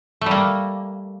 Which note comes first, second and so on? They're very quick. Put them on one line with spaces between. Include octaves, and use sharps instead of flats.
A3 G3 A#3